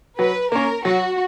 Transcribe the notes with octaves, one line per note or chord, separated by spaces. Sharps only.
F#3 B4
A#3 C#4 A#4
F#3 F#4